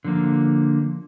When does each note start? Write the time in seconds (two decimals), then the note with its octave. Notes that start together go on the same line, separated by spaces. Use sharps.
0.04 D3 F3 A#3